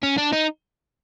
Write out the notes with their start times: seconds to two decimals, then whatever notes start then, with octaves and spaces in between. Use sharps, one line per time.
0.03 C#4
0.18 D4
0.33 D#4